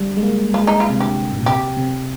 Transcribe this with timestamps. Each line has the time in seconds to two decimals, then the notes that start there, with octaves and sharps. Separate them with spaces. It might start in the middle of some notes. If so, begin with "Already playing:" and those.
Already playing: D3 G3
0.17 G#3
0.23 A#3
0.54 G#3 F4
0.67 D#4
0.80 F4
0.89 C3
1.00 D3 G4
1.32 G#2
1.39 A#2
1.46 C3 G4
1.77 C3